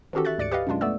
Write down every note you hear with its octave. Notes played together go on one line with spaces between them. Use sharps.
D#3 E3 C#4 F#4 G4 A4
E5 C#6 F#6 A6
D2 G#2 D5 A6 C#7 D7
G4 B4 D5 D#5 F5
F#2 B2 G#3 D4 F4
A3 B3 D5 E6